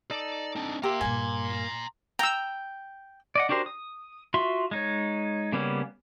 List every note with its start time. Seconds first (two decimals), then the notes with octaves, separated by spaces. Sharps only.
0.11 D#4 A4 D5
0.56 C4 D4
0.83 A#3 G4 E5 A#5 C6
1.01 G2 A#2 G#5
2.19 G5 A#5 E6
3.35 D5 D#5 F#5
3.49 D4 F#4 G4 A#4 C5
3.66 D#6
4.34 F4 F#4 E5 C6
4.71 G#3 D#4 C#5
5.52 C#3 G3 A#3 B3 C#4